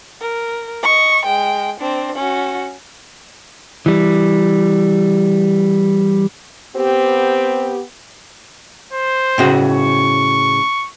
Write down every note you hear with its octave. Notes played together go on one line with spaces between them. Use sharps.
A#4
D#5 C#6
G#3 G5
C4 D4
C#4 F#4
E3 G3
B3 C4 G4
C5
A2 C#3 F#4
C#6